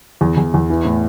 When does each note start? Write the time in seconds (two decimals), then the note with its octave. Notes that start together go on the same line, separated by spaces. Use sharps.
0.21 E2
0.37 E2
0.54 E2
0.70 E3
0.85 A2